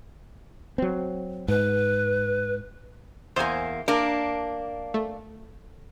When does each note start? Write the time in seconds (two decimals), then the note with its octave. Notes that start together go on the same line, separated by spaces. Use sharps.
0.78 F#3 C4
1.48 G#2 B4
3.36 E2 A#3 C5 G#5
3.88 A#3 D4 A#4
4.94 A3